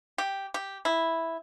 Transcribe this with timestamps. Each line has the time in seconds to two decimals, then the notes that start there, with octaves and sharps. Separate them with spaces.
0.18 G4
0.54 G4
0.85 E4